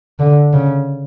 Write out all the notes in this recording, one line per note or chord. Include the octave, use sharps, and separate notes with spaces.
D3
C#3